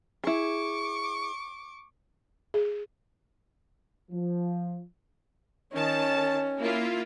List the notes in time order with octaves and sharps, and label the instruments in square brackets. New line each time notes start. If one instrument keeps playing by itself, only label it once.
[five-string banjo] E4 G#4 [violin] C#6 D6
[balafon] G#4
[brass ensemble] F3
[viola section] D#3 A5 [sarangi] C#4
[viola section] A#3 E4 F4